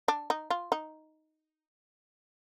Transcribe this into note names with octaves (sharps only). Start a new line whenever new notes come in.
D4
D#4
F4
D#4